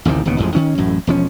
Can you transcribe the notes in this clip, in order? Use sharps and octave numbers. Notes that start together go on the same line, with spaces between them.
A1 D2 C3 D#3
E1 D#2 C#3 B3
A1 F2 F3 G#3
D#3 C#4
A1 F#2 A2
E1 F3 C#4